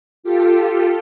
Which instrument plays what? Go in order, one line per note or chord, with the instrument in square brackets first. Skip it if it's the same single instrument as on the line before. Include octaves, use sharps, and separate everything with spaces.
[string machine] F4 G4 A4